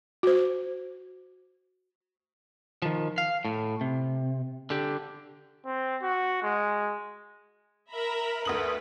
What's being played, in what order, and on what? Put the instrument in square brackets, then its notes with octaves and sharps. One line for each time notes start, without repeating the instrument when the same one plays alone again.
[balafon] F#4 C5
[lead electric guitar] D#3 F3
F5
A2
C3
D3 G4
[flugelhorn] C4
F#4
G#3
[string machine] A#4 [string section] E5 A#5 B5
[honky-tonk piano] D2 D#6 F#7 [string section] A3 B4